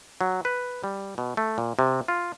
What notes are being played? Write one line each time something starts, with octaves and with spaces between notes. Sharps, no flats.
F#3
B4
G3
B2
A3
A#2
C3
F4